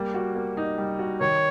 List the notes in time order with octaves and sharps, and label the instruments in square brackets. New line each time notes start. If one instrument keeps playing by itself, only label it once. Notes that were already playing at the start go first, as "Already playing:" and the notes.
Already playing: [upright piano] G3 A#3
F#4
A#3
D#4
G3
F#4
[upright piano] D#3 [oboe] C#5